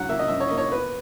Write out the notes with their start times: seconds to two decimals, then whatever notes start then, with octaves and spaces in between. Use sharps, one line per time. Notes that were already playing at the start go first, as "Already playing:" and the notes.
Already playing: F#2 F#3 F#5
0.09 A#3 E5
0.19 D#5
0.28 F#2 E5
0.40 C#5
0.48 A#3 D#5
0.58 C#5
0.72 B3 B4